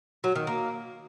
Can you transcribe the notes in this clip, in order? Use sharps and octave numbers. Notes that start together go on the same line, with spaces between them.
F#3
D#3
A#3